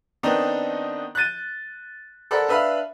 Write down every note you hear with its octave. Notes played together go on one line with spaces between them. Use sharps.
D#3 B3 C4 D4 D#4
F#6 G6 A6 D#7
A4 A#4 C5 D5 F#5 B5
D4 B4 E5 F5 B5